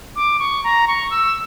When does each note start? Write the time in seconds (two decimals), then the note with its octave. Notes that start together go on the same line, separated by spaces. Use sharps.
0.16 D6
0.40 C#6
0.64 A#5
0.87 C#6
1.11 E6